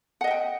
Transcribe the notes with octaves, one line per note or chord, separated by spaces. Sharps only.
D#5 E5 F#5 G5